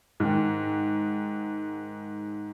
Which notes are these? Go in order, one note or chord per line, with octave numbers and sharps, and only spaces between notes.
G#2 D#3